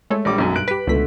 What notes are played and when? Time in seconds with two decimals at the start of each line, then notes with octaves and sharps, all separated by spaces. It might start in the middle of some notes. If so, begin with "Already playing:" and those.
0.10 G#3 A3 A4 C#5
0.25 A#1 G3 D6
0.38 B1 F#2
0.56 G2 F#6 D7
0.68 G4 B4 B6
0.87 C#2 B2 D3 A3 B6